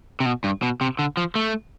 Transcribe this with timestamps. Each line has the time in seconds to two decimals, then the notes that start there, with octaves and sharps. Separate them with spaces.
0.20 C3
0.26 B2
0.44 G2
0.62 B2
0.81 C3
0.99 D3
1.17 F3
1.35 A3